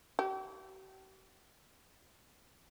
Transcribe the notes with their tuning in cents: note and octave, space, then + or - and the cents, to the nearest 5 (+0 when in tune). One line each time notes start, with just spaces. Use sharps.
G4 -45